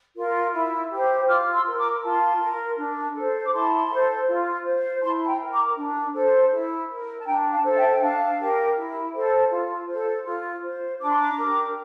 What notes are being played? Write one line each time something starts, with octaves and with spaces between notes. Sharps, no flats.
F4 A#4
E4
G4 C5
F4 D6 F6
C6 E6
A#4
A#5 D6
F4 A5 C6
A#4
D4
A4 C5
D6
E4 A5 C6
A4 C5
F4
C5
E4 A5 C6
A5
G5 A#5
A#4
A#5 D6
D4
A4 C5
E4
A#4
A5
D4 G5 A#5
F5 A5
A4 C5
E5 G5
G5
D4 F5 A5
G4 A#4
E4
A4 C5
F4
A4 C5
F4
C5
D4 D6
C6
A#5 D6
G4 A#4